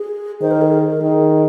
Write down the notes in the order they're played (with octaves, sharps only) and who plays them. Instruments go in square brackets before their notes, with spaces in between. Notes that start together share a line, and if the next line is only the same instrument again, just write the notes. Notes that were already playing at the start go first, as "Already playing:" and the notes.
Already playing: [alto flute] G#4
[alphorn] D#3 [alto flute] C5
[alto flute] A#4
G#4
A#4
[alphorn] D#3 [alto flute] G#4